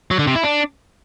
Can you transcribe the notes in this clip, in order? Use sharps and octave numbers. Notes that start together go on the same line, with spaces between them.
F#3
D3
C3
E4
D4